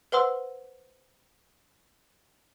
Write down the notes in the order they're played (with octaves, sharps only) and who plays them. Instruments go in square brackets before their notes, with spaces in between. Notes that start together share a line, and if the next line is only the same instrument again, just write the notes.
[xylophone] B4 C5 F#5 C6 E6